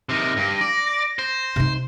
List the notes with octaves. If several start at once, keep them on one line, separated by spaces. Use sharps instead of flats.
C3 D#3 A#6
G2
D5
C5
C3 D#4